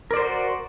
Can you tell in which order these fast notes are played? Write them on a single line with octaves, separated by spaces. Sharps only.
A#4 D5 C5 F#4